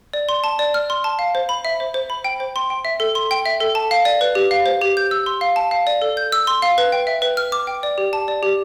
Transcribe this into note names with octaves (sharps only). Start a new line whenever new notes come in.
D5
C6
A5
D5
F6
C6
A5
F5
C5
B5
E5
C5
C5
B5
G5
C5
C6
G5
E5
A4
C6
G5
E5
A4
A5
F5
D5
B4
G4
F5
C5
G4
G6
E6
C6
F5
A5
F5
D5
A4
G6
E6
C6
F5
B4
G5
E5
B4
F6
D6
G5
D5
G4
A5
D5
G4